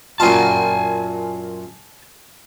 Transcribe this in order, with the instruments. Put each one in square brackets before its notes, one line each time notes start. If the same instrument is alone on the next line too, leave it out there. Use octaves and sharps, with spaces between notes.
[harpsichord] F#2 A#2 F4 [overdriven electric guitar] G#5 A5